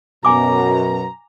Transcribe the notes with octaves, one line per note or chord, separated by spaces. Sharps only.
F#2 B2 G#5 A#5 D6